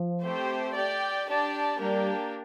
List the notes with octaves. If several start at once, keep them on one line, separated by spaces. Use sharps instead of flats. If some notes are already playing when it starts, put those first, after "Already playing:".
Already playing: F3
A3 C4 G4 C5
G4 D5 G5
D4 G4 D5 A5
G3 A#3 D4 G4 A#4